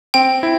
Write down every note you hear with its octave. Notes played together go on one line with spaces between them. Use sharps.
C4 G5
E4